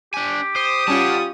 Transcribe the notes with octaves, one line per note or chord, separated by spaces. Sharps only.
D4 G4 G#5
C5 D#6
G3 C#4 F4 F#5 A5